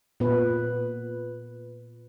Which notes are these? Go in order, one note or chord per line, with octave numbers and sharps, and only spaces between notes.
A#2 B3 B4